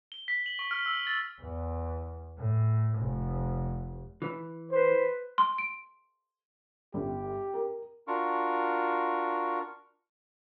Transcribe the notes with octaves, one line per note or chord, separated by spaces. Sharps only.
G7
B6
F#7
C#6
F6
E6
A6
E2
A2
F1
E3
B4 C5
C6
D7
G1 G4
A#4
D4 F4 F#4 A#4 C#6